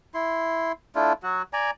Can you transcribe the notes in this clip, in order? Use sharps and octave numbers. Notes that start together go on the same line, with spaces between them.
E4 C6
A3 D4 E4 F4
F#3 F#4
D5 G#5 A#5